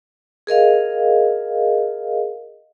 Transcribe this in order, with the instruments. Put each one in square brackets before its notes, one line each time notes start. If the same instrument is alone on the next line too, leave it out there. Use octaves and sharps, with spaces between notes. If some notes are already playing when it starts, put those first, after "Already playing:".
[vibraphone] G#4 A#4 D#5 F5